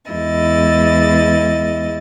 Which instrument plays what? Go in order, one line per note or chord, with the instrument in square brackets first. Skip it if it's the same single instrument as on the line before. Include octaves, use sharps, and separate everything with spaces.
[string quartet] E2 G#3 E4 D#5 A6